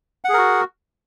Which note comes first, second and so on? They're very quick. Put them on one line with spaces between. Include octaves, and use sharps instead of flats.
F#5 G#4 A#4 F#4